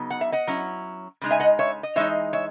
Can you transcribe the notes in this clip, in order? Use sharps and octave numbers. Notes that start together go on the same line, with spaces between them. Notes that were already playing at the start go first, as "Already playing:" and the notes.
Already playing: C#3 F#3 B3 D#4
F#5
E5
D#5 F#5
F#3 C#4 E4
C#3 G#3 D#4
E5 G#5
D#5 F#5
C#5 E5
D#5
E3 G#3 D#4 C#5 E5
C#5 E5